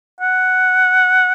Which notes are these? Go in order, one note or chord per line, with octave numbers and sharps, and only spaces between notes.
F#5